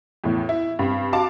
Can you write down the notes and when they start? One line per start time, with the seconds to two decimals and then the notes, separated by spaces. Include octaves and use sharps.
0.24 E2 A2
0.49 E4
0.79 G2 C4
1.13 F#4 F5 A5 D6